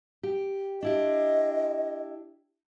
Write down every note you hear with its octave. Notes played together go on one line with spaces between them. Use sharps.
G4
D4 E4 G4 D#5